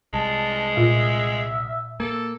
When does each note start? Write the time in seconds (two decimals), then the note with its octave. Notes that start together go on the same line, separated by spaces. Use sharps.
0.13 C2 G#3 A5
0.77 A#2 F4 E5
2.00 A#3 A4